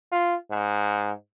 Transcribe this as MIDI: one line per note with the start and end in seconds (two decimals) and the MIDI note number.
0.12 0.35 65
0.51 1.12 44